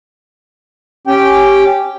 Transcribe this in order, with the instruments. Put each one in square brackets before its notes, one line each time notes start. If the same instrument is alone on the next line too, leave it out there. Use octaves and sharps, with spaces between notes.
[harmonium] C#4 G4 G5